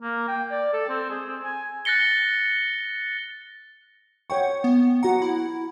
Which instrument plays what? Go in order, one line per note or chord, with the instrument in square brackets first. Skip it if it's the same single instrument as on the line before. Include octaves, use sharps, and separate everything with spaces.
[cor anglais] A#3
G5
D5
A4
C4
G#4
C4
G#5
[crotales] F#6 A6 A#6 C#7 G7
[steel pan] C#5 G5 C#6 [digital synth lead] F#5
[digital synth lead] B3
[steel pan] F#4 A#5 [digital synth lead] F#5
[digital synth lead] E4